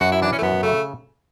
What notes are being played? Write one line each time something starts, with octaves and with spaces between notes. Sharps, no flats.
F#2 F#4
E4
E3 D4
C#4
A3
F#2 B3
C#3 A3